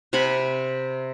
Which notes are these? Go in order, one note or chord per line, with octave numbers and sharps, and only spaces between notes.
C3 F#5 G#5 B5